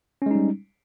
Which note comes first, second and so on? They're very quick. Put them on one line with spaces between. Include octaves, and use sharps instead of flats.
C#4 G#3 D#4 G3